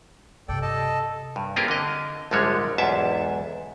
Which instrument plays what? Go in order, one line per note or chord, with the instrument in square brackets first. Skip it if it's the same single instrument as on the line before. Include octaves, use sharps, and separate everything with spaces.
[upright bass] G2 C3 [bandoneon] A4 D5 G5
[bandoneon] A4 D#5 A5
[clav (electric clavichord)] G2
A#3 C4 F4 G4 G#4 A#4
D3 D#5
A#1 G#2 D3 G3 G#3 C#5
B1 E2 G#2 E5 A5